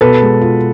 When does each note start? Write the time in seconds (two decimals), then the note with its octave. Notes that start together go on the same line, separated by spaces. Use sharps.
0.01 B2 A4 B4
0.22 G#3
0.41 F4